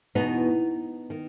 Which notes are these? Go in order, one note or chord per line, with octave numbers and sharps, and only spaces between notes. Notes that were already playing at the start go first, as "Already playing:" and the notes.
E2 B2 B3 D#4
D#3